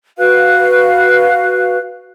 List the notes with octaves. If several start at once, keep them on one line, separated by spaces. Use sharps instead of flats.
F#4 B4 F5 F#6